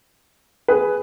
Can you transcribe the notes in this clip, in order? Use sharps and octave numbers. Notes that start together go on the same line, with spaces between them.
G#4 B4